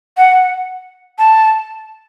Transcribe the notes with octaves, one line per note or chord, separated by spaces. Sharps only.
F#5
A5